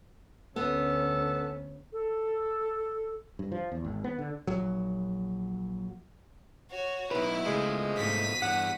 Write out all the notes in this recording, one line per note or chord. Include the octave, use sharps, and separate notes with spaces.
D2 B3 C#4 A4
A4
G2
F3
E2
G#1
B3
D3
A#1 F#3
F#4 C#5
B1 B2 D#3 E4 B4
C#2 B2 F3 G#3 A3
C2 G#2 A3 B6 D#7
E2 G2 F#5